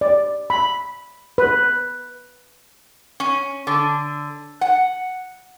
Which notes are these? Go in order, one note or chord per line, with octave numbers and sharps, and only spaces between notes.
D5
B5
B4
C#4
D3
F#5